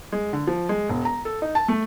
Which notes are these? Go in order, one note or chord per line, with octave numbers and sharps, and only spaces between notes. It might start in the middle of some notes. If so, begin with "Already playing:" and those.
G#3
D3
F3
G#3
E1
A#5
A4
D#4
A5
A3